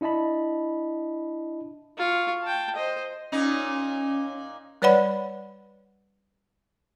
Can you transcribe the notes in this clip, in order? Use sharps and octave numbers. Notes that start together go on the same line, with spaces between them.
D4 E4 D#5 A5 B5
F4 C#6
G5 A5
C5 D#5
A#2 C#4 D#4
G3 B4 C#5 D5 F#5 B5